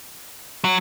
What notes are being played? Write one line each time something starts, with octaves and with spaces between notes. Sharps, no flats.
F#3